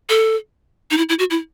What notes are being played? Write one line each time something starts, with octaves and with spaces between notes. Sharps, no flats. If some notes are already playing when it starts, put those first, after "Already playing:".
A4
D#4
E4
E4
F#4
E4